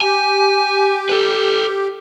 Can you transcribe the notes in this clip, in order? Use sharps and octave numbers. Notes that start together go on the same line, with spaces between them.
G4 G#5
A4 B4